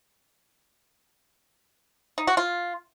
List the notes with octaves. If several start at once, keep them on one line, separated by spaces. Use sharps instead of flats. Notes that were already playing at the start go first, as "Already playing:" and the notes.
D#4
F#4
F4